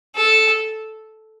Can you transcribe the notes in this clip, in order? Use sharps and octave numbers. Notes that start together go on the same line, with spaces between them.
A4